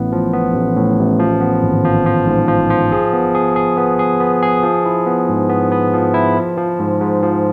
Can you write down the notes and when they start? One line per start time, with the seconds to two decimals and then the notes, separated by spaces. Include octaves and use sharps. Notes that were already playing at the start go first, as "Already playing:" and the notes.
Already playing: A1 A2 B3
0.12 F3
0.33 B3
0.55 A1
0.77 A2
0.98 A1
1.19 F3
1.41 B3
1.63 G#1
1.84 F3
2.06 F3
2.27 G#2
2.49 F3
2.70 F3
2.92 G#4
3.13 B3
3.35 G#4
3.56 G#4
3.77 B3
3.99 G#4
4.20 B3
4.43 G#4
4.63 F3
4.85 E4
5.07 B3
5.29 G#2
5.49 B3
5.72 B3
5.94 F3
6.14 E4
6.37 F3
6.57 F3
6.80 G#2
7.00 G#2
7.23 F3